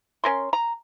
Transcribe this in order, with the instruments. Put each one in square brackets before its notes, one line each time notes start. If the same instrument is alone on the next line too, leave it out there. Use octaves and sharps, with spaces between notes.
[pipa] C#4 A#4 C6
A#5